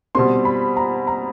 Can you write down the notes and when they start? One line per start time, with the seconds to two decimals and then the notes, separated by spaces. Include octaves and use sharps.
0.15 B2 G3 C4 C6
0.45 B5
0.77 A#5
1.07 A#5